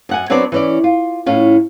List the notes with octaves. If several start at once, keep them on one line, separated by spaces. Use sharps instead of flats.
F#2 F#5 G#5
F#3 B3 C4 D4 C#5 D5
E3 C#4 D5
F4
A2 C#4 F4